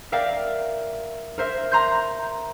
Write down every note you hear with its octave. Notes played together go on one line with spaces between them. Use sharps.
A#4 D5 E5 F5 G5
A#4 C5 E5
A#5 C6 G6